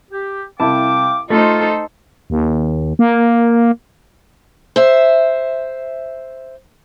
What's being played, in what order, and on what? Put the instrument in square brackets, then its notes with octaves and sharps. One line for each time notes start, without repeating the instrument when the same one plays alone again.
[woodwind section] G4
[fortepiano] C2 E4 A5 [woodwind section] F5 G5 D6
[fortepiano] A3 [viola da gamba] D#4 A4 C5 [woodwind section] F4
[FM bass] D#2
A#3
[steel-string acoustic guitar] C5 E5